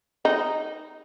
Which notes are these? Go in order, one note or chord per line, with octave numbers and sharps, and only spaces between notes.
D#4